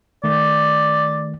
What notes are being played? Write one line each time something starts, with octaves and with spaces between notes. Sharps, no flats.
D#3 A3 D5